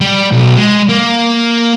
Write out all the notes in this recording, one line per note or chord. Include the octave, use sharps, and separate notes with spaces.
G3
B1
G#3
A#3